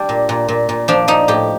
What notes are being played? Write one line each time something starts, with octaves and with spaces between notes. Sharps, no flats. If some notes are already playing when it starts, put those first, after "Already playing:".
Already playing: G3 D4
A#2
A#2
A#2
A#2
F3 D4
F3 D#4
A2 G4